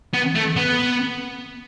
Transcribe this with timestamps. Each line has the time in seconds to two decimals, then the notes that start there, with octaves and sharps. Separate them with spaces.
0.14 B3
0.36 A3
0.56 B3